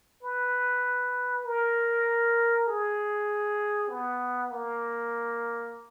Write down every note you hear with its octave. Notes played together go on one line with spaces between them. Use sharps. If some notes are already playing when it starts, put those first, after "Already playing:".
B4
A#4
G#4
B3
A#3